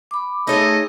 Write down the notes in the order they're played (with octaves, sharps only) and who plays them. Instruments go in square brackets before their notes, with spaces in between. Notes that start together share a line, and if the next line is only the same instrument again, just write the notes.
[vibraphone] B5 D6
[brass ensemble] A3 G#4 A4 [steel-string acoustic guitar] D#4 C#5 E5 [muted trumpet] D#5